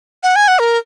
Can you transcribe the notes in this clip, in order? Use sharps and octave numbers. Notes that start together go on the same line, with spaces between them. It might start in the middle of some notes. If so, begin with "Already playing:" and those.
F#5
G#5
F#5
A#4